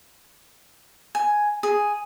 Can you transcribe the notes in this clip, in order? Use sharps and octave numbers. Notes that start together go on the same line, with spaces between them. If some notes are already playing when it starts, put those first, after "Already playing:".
G#5
G#4